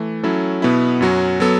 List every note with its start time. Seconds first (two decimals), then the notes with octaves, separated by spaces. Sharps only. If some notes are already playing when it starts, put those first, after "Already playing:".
Already playing: E3 A3
0.23 F#3 C#4 E4 A4
0.62 B2 B3 E4
1.01 F#2 F#3 C#4 F#4
1.40 F#3 B3 A4